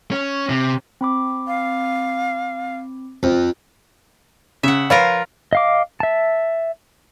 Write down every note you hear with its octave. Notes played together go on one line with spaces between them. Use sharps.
C#4
C3
C4 B5 D6
F5
F2
C#3 E5 F#5
F3 F4 A#4 B4 C#5 F5
D#5 F5 D6
E5 A5